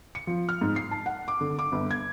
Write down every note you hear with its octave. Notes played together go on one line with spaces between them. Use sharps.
C#7
F3
F6
G#2
C7
A5
F#5
D6
D3
D6
G1
G#6